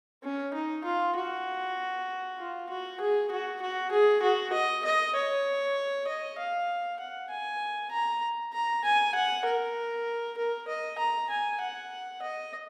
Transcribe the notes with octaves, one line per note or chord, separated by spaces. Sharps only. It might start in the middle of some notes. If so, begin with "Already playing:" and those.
C#4
D#4
F4
F#4
F4
F#4
G#4
F#4
F#4
G#4
F#4
D#5
D#5
C#5
D#5
F5
F#5
G#5
A#5
A#5
G#5
F#5
A#4
A#4
D#5
A#5
G#5
F#5
D#5